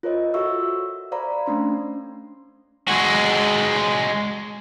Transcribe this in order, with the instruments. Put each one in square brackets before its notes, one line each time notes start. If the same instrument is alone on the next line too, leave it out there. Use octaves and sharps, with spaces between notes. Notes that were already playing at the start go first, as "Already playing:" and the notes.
[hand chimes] F4 A#4 C5 C#5 D#5
F#4 A4 E5 C#6 E6
C5 D5 F5 A#5 B5
A3 C#4 D4 C6
[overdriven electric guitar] G#3 F#4